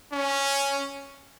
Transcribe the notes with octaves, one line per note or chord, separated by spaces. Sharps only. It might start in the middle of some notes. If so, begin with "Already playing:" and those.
C#4